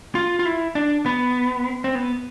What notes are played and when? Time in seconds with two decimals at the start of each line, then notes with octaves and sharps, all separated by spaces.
0.15 F4
0.39 F4
0.45 E4
0.75 D4
1.06 B3
1.84 C4
1.95 B3